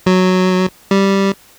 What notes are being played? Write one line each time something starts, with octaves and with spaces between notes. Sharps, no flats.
F#3
G3